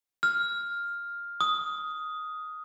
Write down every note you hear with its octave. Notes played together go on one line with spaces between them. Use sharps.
F6
D#6